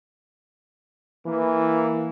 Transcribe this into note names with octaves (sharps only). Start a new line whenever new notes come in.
E3 A#3